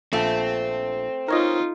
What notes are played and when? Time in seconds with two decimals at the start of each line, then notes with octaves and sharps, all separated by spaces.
0.13 A#1 F3 A3 C4 A4
1.28 D#4 F4 A#4 C#5 D#5